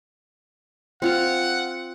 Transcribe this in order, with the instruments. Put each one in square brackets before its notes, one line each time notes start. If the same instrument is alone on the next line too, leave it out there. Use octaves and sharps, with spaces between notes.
[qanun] C4 F4 F5 [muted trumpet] F#5